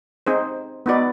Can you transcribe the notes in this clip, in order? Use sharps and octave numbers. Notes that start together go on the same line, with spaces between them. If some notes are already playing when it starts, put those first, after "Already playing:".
C4 D#4 G#4 C5
B3 D#4 F#4 B4 D5